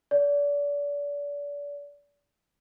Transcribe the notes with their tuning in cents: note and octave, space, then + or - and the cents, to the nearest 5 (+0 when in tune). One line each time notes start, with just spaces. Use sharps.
D5 -35